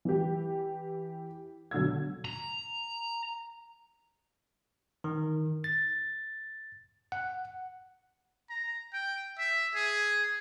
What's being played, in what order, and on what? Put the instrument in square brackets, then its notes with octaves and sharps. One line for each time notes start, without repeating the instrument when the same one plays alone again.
[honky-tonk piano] E3 G4
B1 D3 E6 G#6
[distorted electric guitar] A#5
[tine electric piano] D#3
A6
F#5
[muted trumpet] A#5
G5
E5
G#4